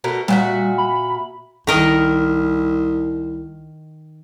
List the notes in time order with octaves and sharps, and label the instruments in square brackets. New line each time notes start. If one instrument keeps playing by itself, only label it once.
[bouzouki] B2 A3 A#4
[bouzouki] A#2 F#4 E5 [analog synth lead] G3
[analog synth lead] B5
[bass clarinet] C2 [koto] D#3 A#4 D#5